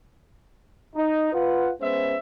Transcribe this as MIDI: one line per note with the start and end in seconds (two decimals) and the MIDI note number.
0.95 1.31 63
1.33 1.70 65
1.33 1.70 71
1.33 1.70 78
1.81 2.16 56
1.81 2.16 59
1.81 2.16 61
1.81 2.16 72
1.81 2.16 76